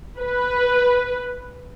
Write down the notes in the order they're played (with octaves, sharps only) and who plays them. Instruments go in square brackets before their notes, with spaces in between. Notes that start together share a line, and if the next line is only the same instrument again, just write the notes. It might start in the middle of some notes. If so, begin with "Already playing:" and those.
[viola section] B4